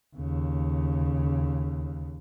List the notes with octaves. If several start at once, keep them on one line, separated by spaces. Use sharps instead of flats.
D#2 C#3